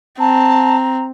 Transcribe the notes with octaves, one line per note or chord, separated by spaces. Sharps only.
C4 A5 A#5